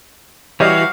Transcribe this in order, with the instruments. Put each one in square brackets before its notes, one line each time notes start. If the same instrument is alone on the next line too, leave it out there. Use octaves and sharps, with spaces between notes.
[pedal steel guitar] E3 [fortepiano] G3 C#5 D#5 [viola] F#4 F5